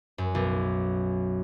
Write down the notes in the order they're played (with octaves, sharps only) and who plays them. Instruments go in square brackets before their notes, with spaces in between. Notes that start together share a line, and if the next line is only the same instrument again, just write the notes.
[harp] F#2
B1